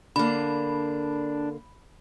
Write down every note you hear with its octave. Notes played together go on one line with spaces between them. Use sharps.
D3 A#3 D4 B5